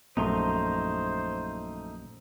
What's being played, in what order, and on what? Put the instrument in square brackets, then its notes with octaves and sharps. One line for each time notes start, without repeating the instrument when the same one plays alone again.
[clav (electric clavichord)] A#1 F#2 [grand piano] A3 [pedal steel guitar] D#4 A#5 C6 [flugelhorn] C5